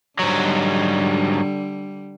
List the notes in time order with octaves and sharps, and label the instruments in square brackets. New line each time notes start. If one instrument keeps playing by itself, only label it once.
[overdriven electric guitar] G#2 F#3 [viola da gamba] D3 G3